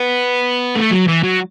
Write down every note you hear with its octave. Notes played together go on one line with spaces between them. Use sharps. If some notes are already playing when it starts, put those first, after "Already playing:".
Already playing: B3
A3
F#3
E3
F#3